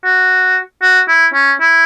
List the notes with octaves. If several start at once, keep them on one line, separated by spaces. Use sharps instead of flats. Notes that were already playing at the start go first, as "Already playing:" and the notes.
F#4
F#4
E4
C#4
E4